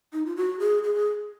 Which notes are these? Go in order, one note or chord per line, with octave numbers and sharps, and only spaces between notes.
D#4
F4
F#4
G#4
G#4